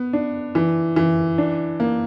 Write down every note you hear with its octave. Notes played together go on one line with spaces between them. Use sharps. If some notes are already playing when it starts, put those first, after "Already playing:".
Already playing: B3
D4
E3
E3
D4
A#3